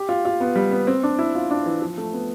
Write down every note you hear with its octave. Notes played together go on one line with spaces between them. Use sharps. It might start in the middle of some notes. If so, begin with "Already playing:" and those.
Already playing: G4
F4
F4
B3
G3
B3
C4
D4
E4
F4
D4
E3
F3
A3
B3